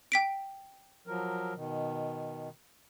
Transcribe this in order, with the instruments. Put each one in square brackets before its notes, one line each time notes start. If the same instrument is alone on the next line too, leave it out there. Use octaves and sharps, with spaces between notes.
[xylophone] G5 B6 D7
[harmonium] F3 F#3 A#4
B2 D#3